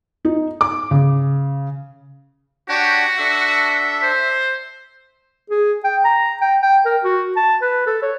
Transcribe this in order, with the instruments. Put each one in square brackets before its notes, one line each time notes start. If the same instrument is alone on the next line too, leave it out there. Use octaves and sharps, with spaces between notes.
[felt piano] D#4
D6
C#3
[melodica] D4 C#5 F#5 [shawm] F#4 [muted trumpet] G4
[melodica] D4 A4 [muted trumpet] E5
[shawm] C5
[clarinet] G#4
G5
A#5
G5
G5
A#4
F#4
A5
B4
A4
C#5